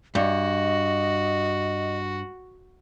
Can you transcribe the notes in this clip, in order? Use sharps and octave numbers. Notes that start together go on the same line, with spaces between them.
G2 F#4 D#5